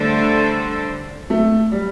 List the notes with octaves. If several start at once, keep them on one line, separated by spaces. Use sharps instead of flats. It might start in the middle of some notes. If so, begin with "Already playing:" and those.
Already playing: D3 G3 A3 D4 A4 C5
A3
G3